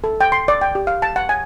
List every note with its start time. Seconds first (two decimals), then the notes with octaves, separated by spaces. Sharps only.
0.04 A4
0.21 G5
0.32 C6
0.48 D5
0.61 G5
0.75 G4
0.87 F5
1.02 A5
1.16 F#5
1.29 G#5